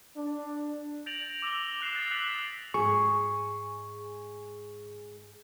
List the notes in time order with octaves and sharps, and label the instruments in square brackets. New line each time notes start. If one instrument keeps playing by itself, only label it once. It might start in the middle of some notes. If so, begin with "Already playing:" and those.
[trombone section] D4
[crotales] G6 A6 A#6 D7 F7 F#7
D6 E6 A#6 F7 G7
D6 F#6 C7 E7
D#6 E6 A6 C7
E6 F#6 B6 D7 F#7
D#6
[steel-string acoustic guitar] G#2 G#4 [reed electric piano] C#6